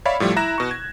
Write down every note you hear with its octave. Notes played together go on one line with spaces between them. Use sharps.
C#5 D5 E5 F5 B5
A2 F3 G3 A3
E4 A#5 F#6 A#6 E7
B2 C#6
G#6